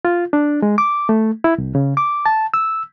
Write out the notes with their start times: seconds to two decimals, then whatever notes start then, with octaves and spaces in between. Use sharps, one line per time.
0.05 F4
0.33 D4
0.62 G#3
0.78 D6
1.09 A3
1.44 E4
1.58 C2
1.75 C#3
1.97 D6
2.26 A5
2.54 E6